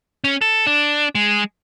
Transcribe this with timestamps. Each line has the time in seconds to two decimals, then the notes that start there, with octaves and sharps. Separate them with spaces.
0.24 C#4
0.41 A4
0.67 D4
1.15 G#3